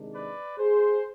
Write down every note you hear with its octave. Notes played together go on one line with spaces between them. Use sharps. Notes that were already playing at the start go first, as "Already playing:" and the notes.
Already playing: C3 D#3 G#3 D4
B4 D5
G#4 C5